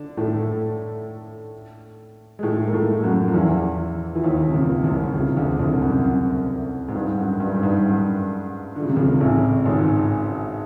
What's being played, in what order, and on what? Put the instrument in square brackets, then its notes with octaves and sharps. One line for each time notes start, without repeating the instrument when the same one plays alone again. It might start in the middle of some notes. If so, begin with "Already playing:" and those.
Already playing: [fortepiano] D3 D4
A2 A3
G#3
A2 A3
A#3
A2 A3
F#2 F#3
F3
E2 E3
E3
D#2 D#3
C3
C#2 C#3
C2 C3
C#2 C#3
D2 D3
C2 C3
F#2
F#2
G#2
G2
F#2
G2
G#2
G2
F#2
D3
C#3
C3
C#2 C#3
A1 A2
G#1 G#2